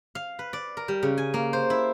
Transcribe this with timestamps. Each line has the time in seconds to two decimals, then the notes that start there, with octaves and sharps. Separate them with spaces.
0.15 F5
0.39 B4
0.53 D5
0.77 A#4
0.88 G3
1.03 C#3
1.18 G#5
1.34 A#3
1.53 C5
1.70 E4